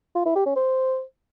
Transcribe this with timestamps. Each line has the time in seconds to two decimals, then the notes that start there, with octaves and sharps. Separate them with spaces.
0.15 F4
0.25 E4
0.36 G4
0.46 C#4
0.56 C5